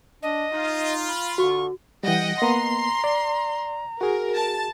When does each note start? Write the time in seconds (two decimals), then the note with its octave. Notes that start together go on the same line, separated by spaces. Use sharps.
0.23 D4 D#5
0.53 D#4 F4
1.09 B5
1.38 D3 F#4 C#6
2.03 E3 G3 D#5 F#5 G5
2.42 A#3 B3 A#5 C6
3.04 D5
4.01 F#4 G#4 A#4
4.35 A5